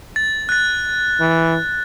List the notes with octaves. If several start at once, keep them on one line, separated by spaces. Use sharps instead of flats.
A6
F#6 A6
E3